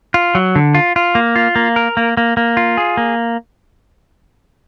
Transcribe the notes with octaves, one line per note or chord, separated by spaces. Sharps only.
F4
F#3
D3
F4
F4
A#3
F4
A#3
A#4
A#3
A#3
A#3
F4
G#4
A#3